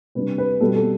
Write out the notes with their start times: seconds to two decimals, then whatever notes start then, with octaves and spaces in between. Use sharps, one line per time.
0.15 C3 G3 D4 B4
0.38 B4
0.60 B2 G3 C4 A4
0.75 A4